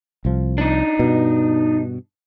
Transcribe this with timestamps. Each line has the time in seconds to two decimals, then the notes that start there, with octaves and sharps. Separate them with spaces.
0.25 C2 F3
0.58 D4 D#4
0.99 G2 B2